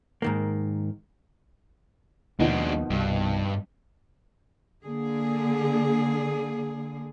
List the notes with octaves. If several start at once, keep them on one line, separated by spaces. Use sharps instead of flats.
G#2 D#3 A#3
D#2 B2 D#3 F3 G#3 D4
C2 G2
D3 A#3 G#4